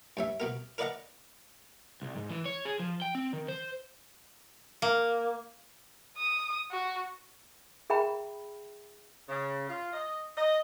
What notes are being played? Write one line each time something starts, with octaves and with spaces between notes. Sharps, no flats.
G2 C#4 E5
B2 B3 A#4
A#4 B4 D5 D#5 F#5 A#5
C2
G#2
E3
C#5
G#4
F3
G5
C4
D#3
C5
A#3
D#6
F#4
G#4 E5 G5 A#5 B5
C#3
F4
D#5
D#5